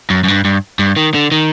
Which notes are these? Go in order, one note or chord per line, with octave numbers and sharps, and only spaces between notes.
F#2
F#2
G2
G2
G2
D#3
D3
D#3